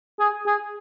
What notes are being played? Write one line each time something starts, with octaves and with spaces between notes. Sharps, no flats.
G#4
G#4